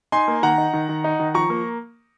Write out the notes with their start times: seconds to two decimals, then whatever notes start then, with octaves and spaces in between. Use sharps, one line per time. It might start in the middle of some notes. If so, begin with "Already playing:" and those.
0.12 D#4 G#5 C6
0.28 A#3
0.43 D#3 F#5 A#5
0.58 D#4
0.73 D#3
0.89 D#3
1.04 D#4
1.20 D#3
1.34 F3 A#5 C#6
1.50 A#3